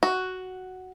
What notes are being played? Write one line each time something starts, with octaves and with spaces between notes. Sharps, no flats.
F#4